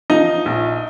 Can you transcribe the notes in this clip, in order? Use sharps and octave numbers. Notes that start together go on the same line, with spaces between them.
F3 D#4 D#5
A#1